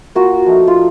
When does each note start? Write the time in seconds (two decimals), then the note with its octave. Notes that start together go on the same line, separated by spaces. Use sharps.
0.15 A#3 F4 F#4
0.46 F3 A3 D#4
0.67 F4